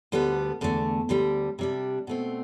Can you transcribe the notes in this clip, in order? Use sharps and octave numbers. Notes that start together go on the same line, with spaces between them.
D2 D3 G3 B3
E2 D3 A3
D2 D3 G3
C3 G3 D4
B2 A3 C4